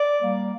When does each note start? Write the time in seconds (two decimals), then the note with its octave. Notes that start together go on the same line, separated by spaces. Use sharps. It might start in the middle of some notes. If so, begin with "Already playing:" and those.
Already playing: D5
0.21 G3 A#3